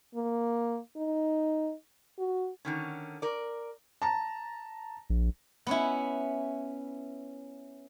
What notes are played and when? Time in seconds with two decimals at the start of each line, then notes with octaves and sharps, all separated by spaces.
0.15 A#3
0.97 D#4
2.19 F#4
2.65 D3 D#3 C#4
3.22 A#4 D5
4.02 A5 A#5
5.10 A#1
5.67 B3 C#4 E4